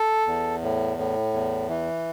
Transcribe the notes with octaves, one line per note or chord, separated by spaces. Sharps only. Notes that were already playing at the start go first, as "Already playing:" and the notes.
Already playing: A4
E2
A2
A2
E2
E3